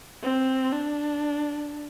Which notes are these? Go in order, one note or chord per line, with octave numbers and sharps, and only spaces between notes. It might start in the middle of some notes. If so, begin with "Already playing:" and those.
C4
D4